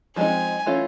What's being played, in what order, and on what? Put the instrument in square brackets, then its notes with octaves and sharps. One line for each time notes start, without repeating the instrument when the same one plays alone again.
[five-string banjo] F3 G#3 C4 D#4 [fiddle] G#5
[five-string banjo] E3 A3 C#4 F4